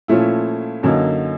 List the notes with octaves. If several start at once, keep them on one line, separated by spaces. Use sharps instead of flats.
A#2 F3 A3 C#4 E4
F#2 D3 F#3 A#3 D#4